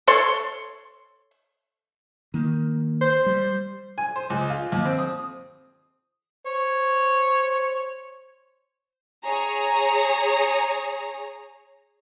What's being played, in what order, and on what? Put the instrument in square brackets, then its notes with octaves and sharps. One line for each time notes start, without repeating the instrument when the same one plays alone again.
[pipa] A4 C#5 C6
[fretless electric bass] D#3 A#3
[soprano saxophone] C5
[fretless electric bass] G3
[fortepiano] G#5
C5
C#2
F4
D#2
C4
D#6
[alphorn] C5 [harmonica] C#5
[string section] G#4 C#5 A#5